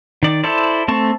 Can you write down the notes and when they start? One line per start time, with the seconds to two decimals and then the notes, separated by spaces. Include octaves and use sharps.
0.23 D#3 D5
0.44 E4 A4 C5 D5
0.88 A3 C4 A5 C#6